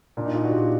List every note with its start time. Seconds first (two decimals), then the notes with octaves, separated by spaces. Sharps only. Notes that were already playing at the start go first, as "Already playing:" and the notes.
0.17 A#2 D4
0.26 D#4
0.35 F4
0.45 F#4
0.52 A#2 G4